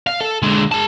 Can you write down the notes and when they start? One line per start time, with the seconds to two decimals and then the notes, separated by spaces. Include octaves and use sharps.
0.07 F5
0.21 A4
0.43 D3 G#3
0.72 G#4 A5